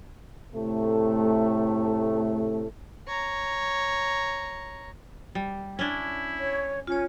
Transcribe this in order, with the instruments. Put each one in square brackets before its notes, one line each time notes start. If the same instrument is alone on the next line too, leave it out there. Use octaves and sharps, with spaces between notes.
[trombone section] A2 C3 A3
[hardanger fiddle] C#5 A#5
[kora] G3
[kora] C#4 D4 [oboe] E4
[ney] C#5
[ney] C#4 [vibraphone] F4 C#5